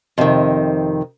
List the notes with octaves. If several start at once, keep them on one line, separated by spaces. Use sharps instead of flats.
F2 C3 D#3